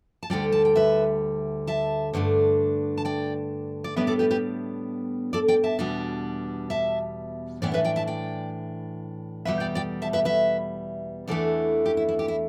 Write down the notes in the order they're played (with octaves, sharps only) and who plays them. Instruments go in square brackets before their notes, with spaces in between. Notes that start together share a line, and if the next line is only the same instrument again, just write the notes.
[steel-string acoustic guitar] A5
D2 D3 G3 D5 G5
A5
G5
B4 E5
E5 A5
G2 D3 A3 D4
A5
D5 G5
D5
A2 G3 B3 D4 B4 E5
A4 D5
G4 B4
G4 B4
A4 D5
D5 G5
E5 A5
E2 B2 G3 D4
E5 A5
A2 E3 B3 D4 D5 G5
B4 E5
D5 G5
E5 A5
D5 G5
E2 B2 G3 B4 E5
D5 G5
D5 G5
E5 A5
B4 E5
B4 E5
E2 E3 A3 D4 A4 D5
G4
E4
E4
G4
E4